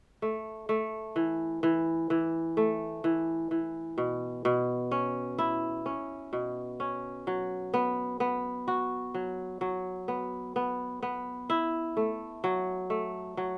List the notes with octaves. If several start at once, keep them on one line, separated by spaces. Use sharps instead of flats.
A3
A3
E3
E3
E3
A3
E3
E3
B2
B2
C#4
E4
C#4
B2
C#4
F#3
B3
B3
F#4
F#3
F#3
B3
B3
B3
E4
A3
F#3
A3
F#3